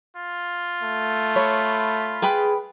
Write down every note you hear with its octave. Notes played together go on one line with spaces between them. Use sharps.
F4
A3
C#5 B5
G#4 B4 G5 B5